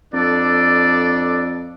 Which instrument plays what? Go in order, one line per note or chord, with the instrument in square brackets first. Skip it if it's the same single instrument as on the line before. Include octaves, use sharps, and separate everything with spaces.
[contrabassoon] F2 [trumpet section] D4 A4 D5